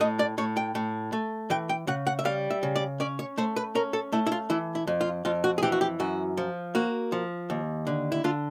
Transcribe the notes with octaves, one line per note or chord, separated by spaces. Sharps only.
A2 D#5
D5
A2 C#5
G5
A2
A3
E3 G5
G5
C#3 F#5
F#5
E5
G3 F5
E5
C#3
D5
C#4 D5
C#5
A3 C5
B4
C#4 A#4
A4
A3 E4
E4
F4
E3 E4
E4
F2
F4
F2 F4
F#4
G#4
E3 G4
F#4
G4
F#2 F#4
F3
A#3 F#4
F3
D#2
D3
E4
D3 F4